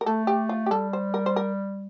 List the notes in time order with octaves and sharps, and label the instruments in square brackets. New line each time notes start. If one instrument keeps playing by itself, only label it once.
[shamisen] A#4
[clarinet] A3 [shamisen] A4
[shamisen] G4
F4
G4
[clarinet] G3 [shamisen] A4
[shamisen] C5
A#4
C5
A#4